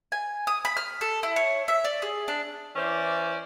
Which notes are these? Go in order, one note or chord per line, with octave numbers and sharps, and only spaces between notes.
G#5
D#6
B5
F6
A4
E4
C#5
E5
D5
G#4
D4
E3 C#4 C5 D5